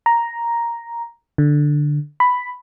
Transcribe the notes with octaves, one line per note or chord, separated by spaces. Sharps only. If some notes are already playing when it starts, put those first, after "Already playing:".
A#5
D3
B5